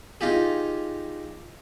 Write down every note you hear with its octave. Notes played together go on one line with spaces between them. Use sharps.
D#4 F4 G4 G#4